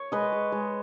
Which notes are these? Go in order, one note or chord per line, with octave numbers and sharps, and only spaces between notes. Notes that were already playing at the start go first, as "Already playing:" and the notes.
Already playing: C#5
G#3 B4 D#5
G#3
G#3